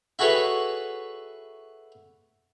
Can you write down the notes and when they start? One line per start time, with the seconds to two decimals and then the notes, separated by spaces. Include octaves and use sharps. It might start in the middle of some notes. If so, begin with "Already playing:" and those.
0.19 E4 F#4 G#4 A4 B4 C#5